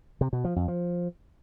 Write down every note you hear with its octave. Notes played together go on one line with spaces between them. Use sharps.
C3
B2
F3
F2
F3